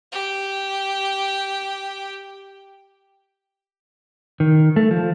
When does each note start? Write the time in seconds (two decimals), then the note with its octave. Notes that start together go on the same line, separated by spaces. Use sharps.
0.12 G4 G5
4.40 D#3
4.76 A3
4.91 F3